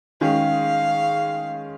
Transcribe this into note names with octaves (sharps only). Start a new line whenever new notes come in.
D#3 G#3 C#4 F5